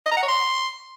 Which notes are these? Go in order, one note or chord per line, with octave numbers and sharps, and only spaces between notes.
D#5
A#5
F#5
C#5
C6